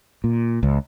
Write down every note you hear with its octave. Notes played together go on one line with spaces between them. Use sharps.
A#2
C#2